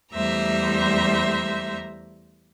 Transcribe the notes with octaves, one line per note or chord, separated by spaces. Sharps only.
E2 G3 A3 C5 E5 A#5